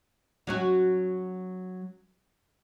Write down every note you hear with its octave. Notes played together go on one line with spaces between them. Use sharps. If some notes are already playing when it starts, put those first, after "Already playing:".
F#3 C#4 F#4